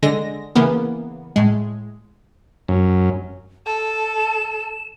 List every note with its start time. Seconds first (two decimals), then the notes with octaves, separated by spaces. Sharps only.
0.02 D3 G#3 A#6
0.55 C#3 E3 A#3 B3
1.36 A2 G#3
2.68 F#2
3.66 A4 E7